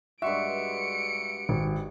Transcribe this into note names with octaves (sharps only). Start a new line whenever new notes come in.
G2 G#3 F#4 E5 C#7 D7
G#1